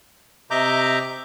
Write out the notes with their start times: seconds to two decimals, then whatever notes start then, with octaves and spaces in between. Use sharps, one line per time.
0.51 C3 D#5 E5 A#5 D6 G6